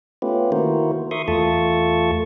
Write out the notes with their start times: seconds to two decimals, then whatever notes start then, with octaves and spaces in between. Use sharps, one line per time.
0.22 A3 B3 C#4 F4 G4 B4
0.52 D#3 A#3 E4 F#4 A#4 C5
1.11 A#4 E5 C6 C#6 D#6
1.28 E2 A3 F4 A4 A5 C#6